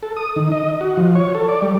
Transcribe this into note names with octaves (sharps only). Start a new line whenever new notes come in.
A4
D#6
D#3
D#5
F#4
F3
C#5
A4
D5
G3